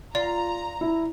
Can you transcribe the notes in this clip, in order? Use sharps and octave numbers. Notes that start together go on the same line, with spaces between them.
F4 D5 A#5
E4